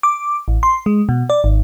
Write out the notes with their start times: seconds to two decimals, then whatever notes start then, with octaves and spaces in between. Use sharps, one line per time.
0.03 D6
0.48 A1
0.63 C6
0.86 G#3
1.09 B2
1.30 D5
1.44 G#1